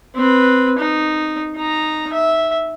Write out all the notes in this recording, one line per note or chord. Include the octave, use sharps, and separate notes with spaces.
C4 B4
D#4
D#4 A#5
E5